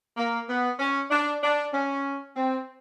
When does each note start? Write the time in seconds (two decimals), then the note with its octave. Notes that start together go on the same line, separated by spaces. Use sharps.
0.17 A#3
0.48 B3
0.79 C#4
1.11 D4
1.43 D4
1.73 C#4
2.35 C4